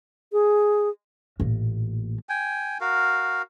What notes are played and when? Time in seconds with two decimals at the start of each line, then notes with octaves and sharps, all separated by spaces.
0.33 G#4
1.40 A1 A#2
2.29 G5 G#5
2.81 F#4 A#4 F5